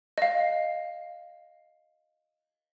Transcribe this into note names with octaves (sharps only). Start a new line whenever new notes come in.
D#5 F5